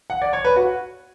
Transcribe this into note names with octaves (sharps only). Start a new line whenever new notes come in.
F#5
D5
C#5
B4
F#4